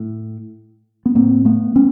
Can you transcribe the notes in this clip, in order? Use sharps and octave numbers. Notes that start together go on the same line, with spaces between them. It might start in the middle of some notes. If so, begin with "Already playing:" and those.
Already playing: A2
B3
A2 A#3 C4
A3 B3
B3 C#4